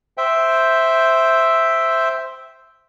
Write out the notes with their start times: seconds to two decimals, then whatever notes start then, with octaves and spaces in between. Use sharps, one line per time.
0.18 C5 E5 G5